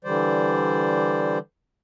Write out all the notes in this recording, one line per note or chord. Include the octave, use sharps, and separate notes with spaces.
D3 E3 G3 C5 D5